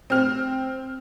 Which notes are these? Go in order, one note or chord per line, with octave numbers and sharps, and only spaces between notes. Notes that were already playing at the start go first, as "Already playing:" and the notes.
C4 F6